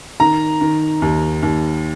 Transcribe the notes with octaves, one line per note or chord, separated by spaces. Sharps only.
D#3 A#5
D#3
D#2
D#2